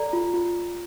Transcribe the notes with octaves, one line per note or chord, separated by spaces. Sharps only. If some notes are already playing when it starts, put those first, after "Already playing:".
Already playing: A4 D5 A#5
F4
F4